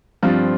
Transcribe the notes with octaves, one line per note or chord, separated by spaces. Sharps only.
G2 F3 C4 F4